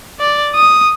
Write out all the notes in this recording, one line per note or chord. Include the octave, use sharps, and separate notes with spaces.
D5
D#6